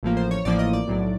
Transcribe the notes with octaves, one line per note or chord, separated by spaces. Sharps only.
A1 A2 F3 A#3
C5
C#5
A1 A2 F3 A#3 D5
D#5
D5
B1 A2 F#3